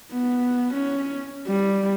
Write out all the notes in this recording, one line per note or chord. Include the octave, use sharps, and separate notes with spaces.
B3
C#4
G3